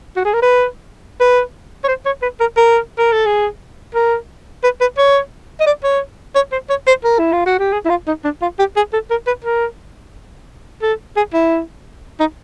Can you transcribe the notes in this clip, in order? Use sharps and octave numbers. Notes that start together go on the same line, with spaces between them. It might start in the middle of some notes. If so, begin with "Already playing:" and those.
F#4
G#4
A#4
B4
B4
C#5
C5
C#5
B4
A#4
A#4
A#4
A4
G#4
A#4
B4
B4
C#5
D#5
D5
C#5
C#5
C5
C#5
C5
A#4
E4
F4
F#4
G4
G#4
E4
F4
D#4
D4
F4
G4
G#4
A4
A#4
B4
A#4
A4
G#4
E4
D#4